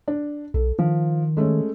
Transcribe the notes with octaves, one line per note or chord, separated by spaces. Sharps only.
D4
B1 A4
D#3 F3
G#3 A3 C#4